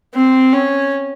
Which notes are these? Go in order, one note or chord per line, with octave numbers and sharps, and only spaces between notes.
C4
C#4